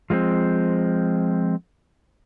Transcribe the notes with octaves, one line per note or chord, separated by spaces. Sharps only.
F3 G#3 A3 C4